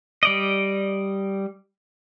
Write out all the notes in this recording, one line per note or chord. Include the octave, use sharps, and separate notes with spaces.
G3 D5 D#5